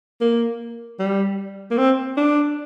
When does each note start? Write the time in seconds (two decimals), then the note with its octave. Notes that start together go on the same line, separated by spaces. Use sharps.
0.21 A#3
0.99 G3
1.71 A#3
1.78 C4
2.17 D4